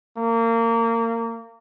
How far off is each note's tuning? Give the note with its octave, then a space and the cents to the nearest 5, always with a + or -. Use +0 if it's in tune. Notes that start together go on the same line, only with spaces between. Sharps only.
A#3 -25